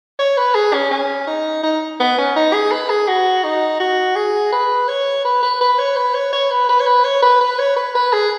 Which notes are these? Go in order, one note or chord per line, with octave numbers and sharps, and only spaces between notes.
C#5
B4
G#4
C#4
C#4
D#4
D#4
B3
C#4
D#4
G#4
B4
G#4
F#4
D#4
F#4
G#4
B4
C#5
B4
B4
B4
C#5
B4
C#5
C#5
B4
B4
C#5
B4
C#5
B4
B4
C#5
B4
B4
G#4